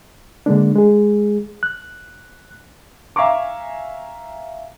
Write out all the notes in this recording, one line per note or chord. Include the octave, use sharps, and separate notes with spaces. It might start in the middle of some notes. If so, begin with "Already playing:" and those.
D3 G#3 A#3 D4
G#3 G#4
F#6
E5 F5 G#5 A#5 C#6 D6